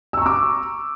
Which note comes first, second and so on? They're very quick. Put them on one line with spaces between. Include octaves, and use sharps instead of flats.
E6 C#6 A#5 D6